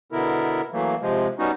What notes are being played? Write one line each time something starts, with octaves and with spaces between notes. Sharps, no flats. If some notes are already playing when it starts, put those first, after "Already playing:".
B2 D3 B3 E4 A#4
E3 F#3 A3 A#3
C3 F3 G#3
G3 B3 C#4 D#4 F#4